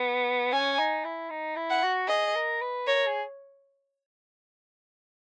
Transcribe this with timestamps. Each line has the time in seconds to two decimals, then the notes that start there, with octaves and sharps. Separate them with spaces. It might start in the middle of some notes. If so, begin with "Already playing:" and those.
Already playing: B3
0.52 C#4 G#5
0.79 D#4
1.04 E4
1.30 D#4
1.56 E4
1.70 F#5
1.83 F#4
2.08 G#4 D#5
2.35 A#4
2.61 B4
2.87 A#4 C#5
3.06 G#4